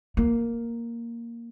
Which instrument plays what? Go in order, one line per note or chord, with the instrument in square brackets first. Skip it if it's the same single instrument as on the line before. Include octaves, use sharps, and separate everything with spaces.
[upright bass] A#3